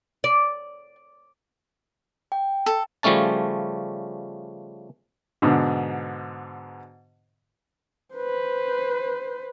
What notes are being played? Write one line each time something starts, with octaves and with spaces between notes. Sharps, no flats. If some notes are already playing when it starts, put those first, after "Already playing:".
D5
G5
A4
C#3 F3 G3 A3 C#4 A5
G#2 B2 D3
B4 C5